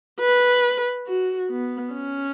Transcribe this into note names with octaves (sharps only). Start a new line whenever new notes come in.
B4
F#4
B3
C#4